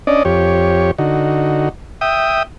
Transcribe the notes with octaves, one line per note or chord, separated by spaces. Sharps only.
C#4 D4 D5 D#5
F2 G4 C#5
D3 D#4 F#4
E5 G5 D#6